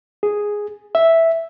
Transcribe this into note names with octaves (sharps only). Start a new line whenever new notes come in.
G#4
E5